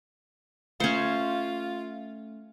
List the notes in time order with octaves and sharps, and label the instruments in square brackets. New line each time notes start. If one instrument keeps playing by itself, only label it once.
[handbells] A3 C#7 [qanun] C#4 C5 [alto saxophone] F4